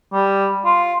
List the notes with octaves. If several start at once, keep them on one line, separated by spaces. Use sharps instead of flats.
G3
F4